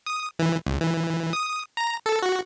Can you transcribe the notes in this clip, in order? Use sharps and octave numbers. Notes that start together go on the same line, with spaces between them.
D#6
E3
C#2
E3
D#6
A#5
A4
F#4